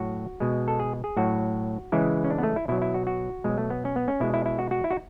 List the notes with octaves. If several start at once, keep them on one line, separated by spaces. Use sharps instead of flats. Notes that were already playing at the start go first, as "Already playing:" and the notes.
Already playing: A2 F#3 F#4
B2 G#3
A4
G#4
G#4
A2 F#3 F#4
C#3 E3 G#3 E4
C#4
D4
B3
A3
E4
B2 F#3 E4
E4
F#4
F#4
B2 F#3 G#3
A3
B3
C#4
B3
C#4
B2 G#3 E4
E4
E4
F#4
F#4
E4
F#4